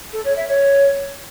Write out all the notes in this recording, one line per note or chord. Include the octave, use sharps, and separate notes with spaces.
A4
C#5
E5
C#5